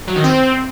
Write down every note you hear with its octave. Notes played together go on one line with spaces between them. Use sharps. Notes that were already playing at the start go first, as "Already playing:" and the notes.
F#3
D#3
C4